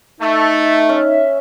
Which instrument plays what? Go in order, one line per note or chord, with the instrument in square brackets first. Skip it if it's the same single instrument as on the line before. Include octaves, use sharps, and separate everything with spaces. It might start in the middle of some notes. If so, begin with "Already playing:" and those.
[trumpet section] A3 [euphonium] D#4 [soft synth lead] E5
[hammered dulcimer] C#4